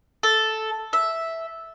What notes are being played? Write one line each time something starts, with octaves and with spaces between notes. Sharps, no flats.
A4
E5